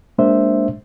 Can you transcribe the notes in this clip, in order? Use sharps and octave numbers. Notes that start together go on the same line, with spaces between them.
G#3 A#3 D4 C5 E5